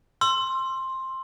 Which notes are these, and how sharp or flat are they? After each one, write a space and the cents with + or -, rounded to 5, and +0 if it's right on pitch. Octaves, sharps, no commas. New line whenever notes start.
C6 +10 E6 +30